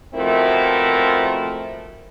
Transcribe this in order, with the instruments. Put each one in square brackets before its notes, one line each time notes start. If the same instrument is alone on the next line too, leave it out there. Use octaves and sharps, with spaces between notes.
[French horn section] B2 F3 A3 C4 E4 A#4